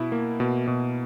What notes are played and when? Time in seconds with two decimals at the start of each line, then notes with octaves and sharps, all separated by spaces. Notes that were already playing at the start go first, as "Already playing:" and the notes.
Already playing: B2 E4
0.12 A#3
0.40 B2
0.67 B2